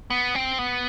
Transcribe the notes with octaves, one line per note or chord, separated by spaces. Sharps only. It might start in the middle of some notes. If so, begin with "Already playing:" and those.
B3
C4
B3